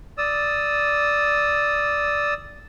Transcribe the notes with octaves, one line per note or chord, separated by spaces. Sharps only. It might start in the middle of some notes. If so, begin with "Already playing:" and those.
D5 D#6 E6